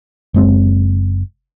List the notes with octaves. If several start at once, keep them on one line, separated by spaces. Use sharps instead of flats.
F#1 G#3 C4